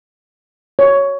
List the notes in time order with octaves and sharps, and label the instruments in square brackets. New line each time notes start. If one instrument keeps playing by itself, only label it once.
[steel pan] C#5